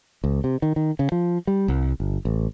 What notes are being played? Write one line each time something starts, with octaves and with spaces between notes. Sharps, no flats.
C#2
C3
D#3
D#3
C#3
F3
G3
C2
G1
A1